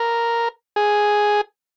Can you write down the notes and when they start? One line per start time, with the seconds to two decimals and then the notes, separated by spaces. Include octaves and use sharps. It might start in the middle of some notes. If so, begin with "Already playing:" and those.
Already playing: A#4
0.76 G#4